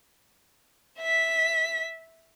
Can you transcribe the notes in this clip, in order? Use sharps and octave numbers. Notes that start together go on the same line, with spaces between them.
E5 B6